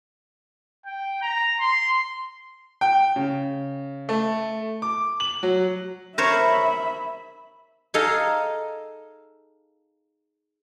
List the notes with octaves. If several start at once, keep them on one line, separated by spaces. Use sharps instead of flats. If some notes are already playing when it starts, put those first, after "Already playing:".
G5
A#5
C6
G5
C#3
A3
D6
F#7
F#3
A#4 C5 C#5 E5 B5
D#4 G#4 A4 D#5 F5